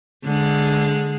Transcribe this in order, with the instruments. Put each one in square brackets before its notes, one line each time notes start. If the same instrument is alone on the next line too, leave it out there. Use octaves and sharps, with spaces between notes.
[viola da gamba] D3 G#3